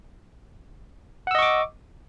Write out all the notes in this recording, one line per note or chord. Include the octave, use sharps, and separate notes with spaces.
D#5 F#5 C#6 D6 E6